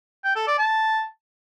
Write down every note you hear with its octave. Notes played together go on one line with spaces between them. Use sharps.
G5
A4
D5
A5